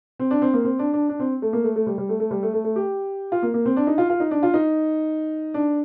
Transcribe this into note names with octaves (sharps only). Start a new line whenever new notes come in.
C4
D4
C4
A#3
C4
D4
D4
D4
C4
A3
A#3
A3
A3
G3
G3
A3
A3
G3
A3
A3
A3
G4
F4
A#3
A#3
C4
D4
D#4
F4
F4
D#4
D4
F4
D#4
D4